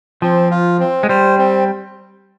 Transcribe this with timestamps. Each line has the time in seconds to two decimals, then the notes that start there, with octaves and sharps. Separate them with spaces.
0.22 F3 C4
0.51 F4
0.80 C4
1.03 G#3
1.09 G3 C5
1.38 C4